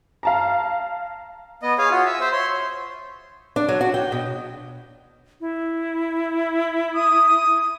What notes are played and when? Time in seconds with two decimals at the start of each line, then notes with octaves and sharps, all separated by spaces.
0.23 F5 A5 A#5
1.63 B3 D#5
1.78 G#4 C#5 F5 G#5
1.91 F4 F#4
2.05 E5
2.21 C5 E5
2.32 C#5 C6
3.56 D4
3.68 F#3
3.81 F#4
3.94 G5
4.12 B2
5.41 E4
6.95 D#6